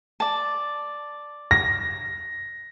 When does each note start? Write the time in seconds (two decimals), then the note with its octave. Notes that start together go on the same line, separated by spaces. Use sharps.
0.20 D5 A5
1.51 A#6